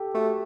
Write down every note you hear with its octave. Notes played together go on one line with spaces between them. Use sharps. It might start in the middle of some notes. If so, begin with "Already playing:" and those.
Already playing: G4 A4
A3 F#4